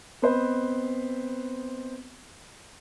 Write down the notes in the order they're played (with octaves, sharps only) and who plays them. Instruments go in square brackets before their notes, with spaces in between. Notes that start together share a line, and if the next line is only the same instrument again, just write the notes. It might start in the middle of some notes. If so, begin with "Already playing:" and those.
[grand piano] B3 C4 B4 C5 D#5